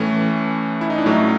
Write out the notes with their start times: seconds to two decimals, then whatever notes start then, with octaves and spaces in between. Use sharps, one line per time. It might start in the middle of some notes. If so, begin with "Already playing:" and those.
Already playing: A2 E3 A3 C#4
0.81 E4
0.90 D#4
0.98 D4
1.06 A2 F#3 A3 C#4